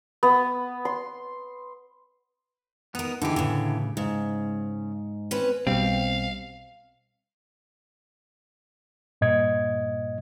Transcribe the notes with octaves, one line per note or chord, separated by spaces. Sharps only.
B3
C6
B3 D#4 A#4
D3 E3 D#4 G4 G#4
A2 C#3
G#2 C#3
C4 C#4 B4
B1 B2 G3 C4 F5
G2 A#2 D#5 G#6